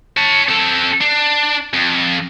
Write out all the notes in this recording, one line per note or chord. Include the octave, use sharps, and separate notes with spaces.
C#5 A5
C4 A4
D4
F2